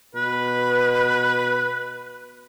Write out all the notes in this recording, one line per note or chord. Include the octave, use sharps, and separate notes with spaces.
B2 B4